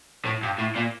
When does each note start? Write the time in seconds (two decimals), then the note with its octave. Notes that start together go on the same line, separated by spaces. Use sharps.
0.25 A2
0.43 G2
0.58 A2
0.75 A#2